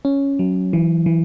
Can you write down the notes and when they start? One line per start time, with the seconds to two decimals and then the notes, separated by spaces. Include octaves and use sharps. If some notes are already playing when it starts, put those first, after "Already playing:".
0.05 C#4
0.39 F#3
0.73 E3
1.06 E3